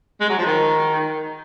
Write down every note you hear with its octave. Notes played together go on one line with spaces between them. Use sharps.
G#3
F#3
F3
D#3